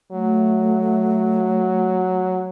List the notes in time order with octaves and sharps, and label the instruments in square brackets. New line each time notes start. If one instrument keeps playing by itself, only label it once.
[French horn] F#3 [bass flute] A3